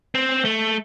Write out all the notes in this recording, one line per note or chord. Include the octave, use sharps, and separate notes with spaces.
C4
A3